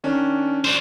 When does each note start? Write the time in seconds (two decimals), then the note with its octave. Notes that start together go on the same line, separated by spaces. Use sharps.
0.04 D#3 C#4 D4
0.65 D4 C5